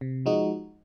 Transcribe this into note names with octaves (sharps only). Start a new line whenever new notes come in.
C3
F3 G#3 D#4 F#4